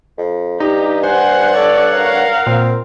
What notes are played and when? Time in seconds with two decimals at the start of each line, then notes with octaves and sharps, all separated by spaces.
0.18 F2
0.60 G2 D#4 G4
1.03 C5 F#5 G#5
1.55 A4 C#5 D5
1.94 A#4 F5
2.46 A#2 C4